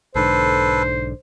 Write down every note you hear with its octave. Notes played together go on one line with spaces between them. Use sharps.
B1 G#2 D3 A4 B4 C5